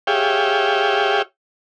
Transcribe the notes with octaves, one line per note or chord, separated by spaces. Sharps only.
G4 G#4 C#5 E5 F5 G5